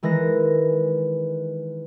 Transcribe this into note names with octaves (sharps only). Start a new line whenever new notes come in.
D#3 E3 G#3 F#6 A#6